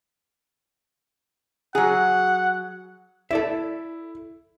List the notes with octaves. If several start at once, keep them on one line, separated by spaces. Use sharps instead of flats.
F#3 G#4 F#5
E4 A4 D5 E5